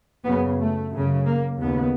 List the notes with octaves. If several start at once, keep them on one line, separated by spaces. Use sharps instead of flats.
F#2 C#3 B3
A3
F#2 C#3
A#3
D#2 C#3 B3